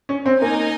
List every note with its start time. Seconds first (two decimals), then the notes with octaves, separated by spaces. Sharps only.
0.09 C#4
0.26 C4
0.41 A#3 D#4 A#4 D#5 G#5